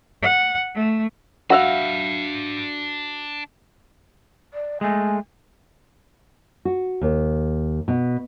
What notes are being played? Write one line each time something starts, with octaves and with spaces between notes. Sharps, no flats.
F#5
A3
D4 F#4 E5 F5 B5
D5
G#3 A3 G#5
F#4
D#2
B2